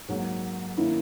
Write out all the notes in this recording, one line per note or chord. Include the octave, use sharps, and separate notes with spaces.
G#2 F#3 A#3
D#3 A#3 C#4 E4